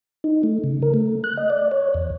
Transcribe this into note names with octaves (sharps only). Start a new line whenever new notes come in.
D#4
A3
C#3
A#4
A3
F#6
D#5
D5
C#5
E2